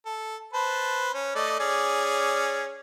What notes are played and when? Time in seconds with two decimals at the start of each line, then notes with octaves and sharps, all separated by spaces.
0.06 A4
0.53 B4 C5 A5
1.14 C#4
1.35 A3 D5 D#5
1.59 C#4 G#4 D5